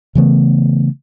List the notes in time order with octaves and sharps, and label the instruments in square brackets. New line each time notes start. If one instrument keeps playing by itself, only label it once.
[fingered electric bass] C#3 E3 A3 B3